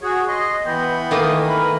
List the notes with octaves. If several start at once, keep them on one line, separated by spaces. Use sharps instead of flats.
F#4 G#4 C#5
D#5 C6
E3 B3 G5
D#3 A3 A#3 D#6
A#4 B4